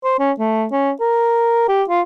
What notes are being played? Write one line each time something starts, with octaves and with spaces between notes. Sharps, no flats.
C5
C#4
A3
C#4
A#4
G4
F4